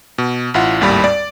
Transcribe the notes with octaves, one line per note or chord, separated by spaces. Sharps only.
B2
A1 E4 F4 F#5
G#1 D#2 A2 G3 B5
D5